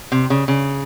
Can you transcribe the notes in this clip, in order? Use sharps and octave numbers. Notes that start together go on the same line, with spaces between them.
C3
C#3
C#3